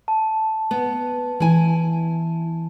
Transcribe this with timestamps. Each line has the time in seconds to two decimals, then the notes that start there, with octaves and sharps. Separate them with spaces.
0.08 A5
0.71 B3
1.40 E3 E4 G#5